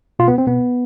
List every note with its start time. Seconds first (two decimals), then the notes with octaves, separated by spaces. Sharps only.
0.19 B2 F4
0.28 B3
0.38 C4
0.47 B2 B3